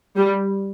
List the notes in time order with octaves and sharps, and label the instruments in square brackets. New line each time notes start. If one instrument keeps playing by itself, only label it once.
[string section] G3